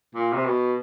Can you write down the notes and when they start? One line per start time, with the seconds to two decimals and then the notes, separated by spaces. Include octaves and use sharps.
0.15 A#2
0.33 C3
0.46 B2